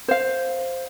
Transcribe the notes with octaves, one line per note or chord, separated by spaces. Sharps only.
C5 F5